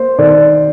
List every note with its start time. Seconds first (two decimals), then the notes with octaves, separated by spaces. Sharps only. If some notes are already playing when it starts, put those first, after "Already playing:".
Already playing: A#3 C5
0.18 D#3 D5